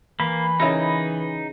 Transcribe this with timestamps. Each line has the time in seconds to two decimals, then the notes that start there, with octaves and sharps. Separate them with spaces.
0.20 E3 A#3 B5
0.60 C#3 D#4 E4 A#4